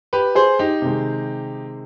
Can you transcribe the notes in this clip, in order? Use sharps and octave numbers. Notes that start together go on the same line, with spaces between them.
G4 B4
G#4 C5
D#4 G4
C3 D#3 G#3